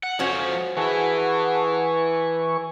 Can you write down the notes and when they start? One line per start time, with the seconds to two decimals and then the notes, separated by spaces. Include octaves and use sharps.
0.03 F#5
0.19 F2 F3 C#4 F#4 C5 C#5
0.77 E3 E4 G#4 B4 F#5 G#5 A5 C#6